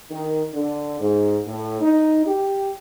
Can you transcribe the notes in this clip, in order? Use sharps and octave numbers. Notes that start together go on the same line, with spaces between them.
D#3
D3
G#2
A2
D#4
G4